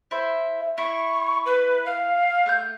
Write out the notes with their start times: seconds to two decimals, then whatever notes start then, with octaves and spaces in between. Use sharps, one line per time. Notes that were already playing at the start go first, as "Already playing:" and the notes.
0.11 E4 C5 E5
0.78 E4 C#6
1.46 B4
1.86 F5
2.46 A3 F#5 G6